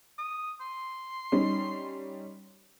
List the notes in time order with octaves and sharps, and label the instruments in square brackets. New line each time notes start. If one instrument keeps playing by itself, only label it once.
[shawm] D#6
C6
[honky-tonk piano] G3 C#4 D#4